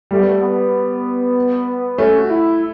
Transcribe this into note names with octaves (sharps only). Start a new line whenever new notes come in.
G3 A3
B3
A3
B3
A3 C#4
F#4
E4